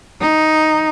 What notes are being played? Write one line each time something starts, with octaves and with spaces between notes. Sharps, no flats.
D#4